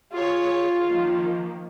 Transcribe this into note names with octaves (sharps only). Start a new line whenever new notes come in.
F4 G#4 C#5
D#3 F3 A#3